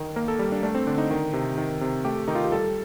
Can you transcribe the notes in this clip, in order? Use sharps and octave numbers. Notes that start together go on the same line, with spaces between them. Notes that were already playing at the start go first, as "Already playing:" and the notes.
Already playing: D#3
A#3 A#4
A4
G3
D4
A3 D4
C4
D3 D4
D#4
D#3
C3
D#3
C3
A3 G4
D#3 D#4
F4
G4
G3 A4